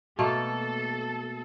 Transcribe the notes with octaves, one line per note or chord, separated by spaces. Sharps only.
B2 A3 A#3 A4